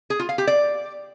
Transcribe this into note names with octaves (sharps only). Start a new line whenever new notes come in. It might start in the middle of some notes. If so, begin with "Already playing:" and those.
G#4
F4
F5
G4
D5